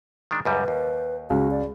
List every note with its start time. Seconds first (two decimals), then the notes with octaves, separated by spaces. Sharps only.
0.31 D#3 G#3 D4
0.45 C#2 F#2 G3 B4
0.68 D#2
1.30 C#2 F#4
1.51 D5